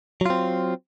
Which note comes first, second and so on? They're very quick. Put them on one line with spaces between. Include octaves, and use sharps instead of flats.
F#3 F4 C4